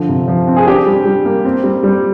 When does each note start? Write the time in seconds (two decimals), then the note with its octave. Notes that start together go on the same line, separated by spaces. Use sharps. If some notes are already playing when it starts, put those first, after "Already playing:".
Already playing: D3 F3
0.09 C3
0.28 F3
0.48 C4
0.56 G#4
0.67 D4 G4
0.86 G3
1.05 G3
1.25 A#3
1.45 C4
1.64 G3
1.83 G3